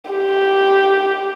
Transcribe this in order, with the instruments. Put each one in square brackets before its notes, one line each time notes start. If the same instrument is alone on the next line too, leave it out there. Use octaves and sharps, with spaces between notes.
[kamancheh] G4